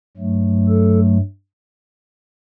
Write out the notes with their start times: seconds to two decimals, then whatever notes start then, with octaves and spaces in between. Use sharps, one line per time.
0.17 G2 F#3 A3
0.68 A4